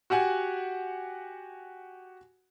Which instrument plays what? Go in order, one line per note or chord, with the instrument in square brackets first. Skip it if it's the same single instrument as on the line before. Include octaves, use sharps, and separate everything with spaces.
[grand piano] F#4 G4 F#5 G#5